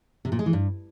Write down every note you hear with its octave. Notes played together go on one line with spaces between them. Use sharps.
C3
A#2
G#3
E3
G2